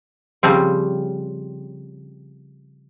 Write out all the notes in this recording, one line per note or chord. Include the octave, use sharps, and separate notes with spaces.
C#3 F3 G3 C4